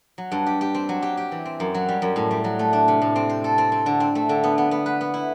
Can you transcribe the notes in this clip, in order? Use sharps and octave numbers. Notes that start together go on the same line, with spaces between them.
F#3
G2
G4
G4
C4
F#3
G4
G4
E3
C4
F#2
F#3
G3
F#2
A2
G3
F#3
A3
D4
C3
A2
C4
C5
A4
C4
C4
D3
C4
A3
D3
B3
B3
B3
B4
B3
E4